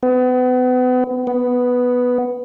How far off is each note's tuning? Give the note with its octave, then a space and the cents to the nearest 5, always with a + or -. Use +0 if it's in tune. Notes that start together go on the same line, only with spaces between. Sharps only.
B3 +35
B3 +0